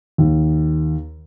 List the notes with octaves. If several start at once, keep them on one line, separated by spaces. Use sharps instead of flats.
D#2